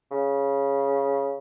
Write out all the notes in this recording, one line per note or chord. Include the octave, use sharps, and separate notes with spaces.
C#3